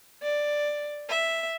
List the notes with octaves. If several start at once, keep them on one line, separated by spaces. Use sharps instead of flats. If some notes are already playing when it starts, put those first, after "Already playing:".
D5
E5